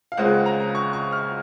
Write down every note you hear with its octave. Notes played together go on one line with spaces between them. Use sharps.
F5
C#2 C#3 G#3 C4 F4 F#5
A#5
C#6
C#6
F6